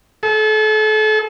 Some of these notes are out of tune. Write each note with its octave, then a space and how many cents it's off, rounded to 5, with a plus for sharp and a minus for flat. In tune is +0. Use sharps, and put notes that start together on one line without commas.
A4 -35